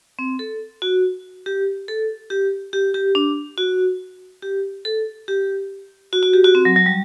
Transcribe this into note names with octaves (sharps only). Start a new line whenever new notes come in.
C4
A4
F#4
G4
A4
G4
G4
G4
D4
F#4
G4
A4
G4
F#4
F#4
G4
F#4
C4
F#3
F#3
G3